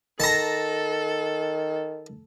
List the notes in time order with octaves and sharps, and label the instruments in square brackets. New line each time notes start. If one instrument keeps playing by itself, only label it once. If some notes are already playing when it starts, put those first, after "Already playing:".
[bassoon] D#3 [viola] A4 [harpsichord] A5 A#5